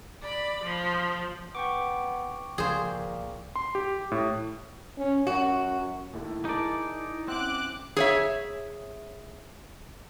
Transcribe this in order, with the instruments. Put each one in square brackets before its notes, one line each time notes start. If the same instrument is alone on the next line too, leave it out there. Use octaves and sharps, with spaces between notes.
[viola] D5 B5
F3
[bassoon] B3 [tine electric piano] G5 C#6 D6
[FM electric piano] C#2 F3 [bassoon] A#2 [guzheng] G#4 C5
[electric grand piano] C6
G4
A2
[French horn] C#4
[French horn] F#2 [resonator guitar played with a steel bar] F#4
[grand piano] D#2 A2 A3 [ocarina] E4
[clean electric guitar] D#4 D5 [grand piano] G#4 A#4 A5
[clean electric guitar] C4 [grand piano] C#4 E5 F#5 [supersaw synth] D6 F#6
[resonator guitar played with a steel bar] G#4 C#5 E5